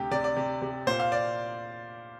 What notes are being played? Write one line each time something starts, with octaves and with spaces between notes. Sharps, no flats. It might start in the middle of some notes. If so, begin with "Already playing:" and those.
Already playing: D2 C3 G4
C3 D5
D5
C3
C3
A#2 C5
F5
D5